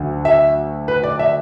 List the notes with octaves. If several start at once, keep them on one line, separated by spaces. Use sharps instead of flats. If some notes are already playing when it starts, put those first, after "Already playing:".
Already playing: D2 D3 F#3
E5
B4
D5
E5